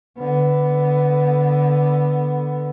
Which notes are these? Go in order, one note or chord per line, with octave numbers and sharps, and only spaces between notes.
D3 B3